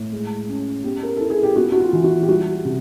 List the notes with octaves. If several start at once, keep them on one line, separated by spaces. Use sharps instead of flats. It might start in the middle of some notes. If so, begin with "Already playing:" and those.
Already playing: A2
G#3
C#4
B3 G4
A#4
E4 A4
G#4
G4
B3 F#4
F#4
F4
E3
F#4
G4
G3 F#4
C3